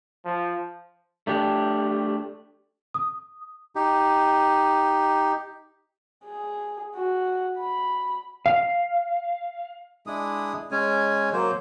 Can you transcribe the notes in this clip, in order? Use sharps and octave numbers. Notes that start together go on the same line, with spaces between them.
F3
A3 D4 G4
D#6
D#4 G4
G#4
F#4
B5
F5
G#3 D4 E4 D#6
G#3 C#4 G#5
F#3 A#3 C5